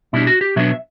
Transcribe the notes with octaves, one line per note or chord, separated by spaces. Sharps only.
B2 G3 D4 E4
F#4
G4
B2 F#3 B3 D4 E5